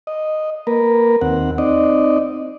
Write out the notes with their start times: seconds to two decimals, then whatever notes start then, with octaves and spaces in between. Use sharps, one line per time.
0.07 D#5
0.67 A#3 A#4 B4
1.21 D#2 C4 F#5
1.58 C4 D#4 D5 D#5